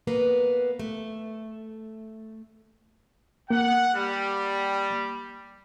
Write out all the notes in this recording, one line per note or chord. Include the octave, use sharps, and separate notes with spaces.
A#3 B3 B4
A3
A#3 F#5
G3